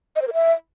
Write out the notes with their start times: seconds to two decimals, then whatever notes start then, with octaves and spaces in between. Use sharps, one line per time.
0.16 D#5
0.22 C5
0.28 A#4
0.33 E5